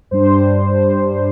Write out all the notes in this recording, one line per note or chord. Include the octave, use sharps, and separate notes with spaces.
G2 G3 D4 C5